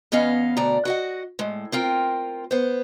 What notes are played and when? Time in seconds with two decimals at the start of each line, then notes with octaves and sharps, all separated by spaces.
0.12 E2 B3 C#4 D#5 F5
0.57 D2 B2 D5 A#5
0.85 F#4 D#5 F#5
1.39 A2 G#3
1.72 C4 F4 A#4 G5
2.51 B3 C5